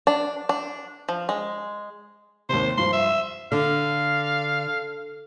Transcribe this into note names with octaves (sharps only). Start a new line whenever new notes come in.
D4
D4
F3
G#3
D#2 C3 C5
G2 F3 C6
E5
D3 F5